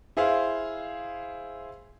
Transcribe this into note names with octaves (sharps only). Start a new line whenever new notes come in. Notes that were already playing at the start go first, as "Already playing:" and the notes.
E4 G#4 C5 F5